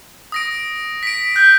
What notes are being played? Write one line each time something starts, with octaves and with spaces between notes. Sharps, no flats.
D#6 A#6 D7
B6 D7
F#6 G6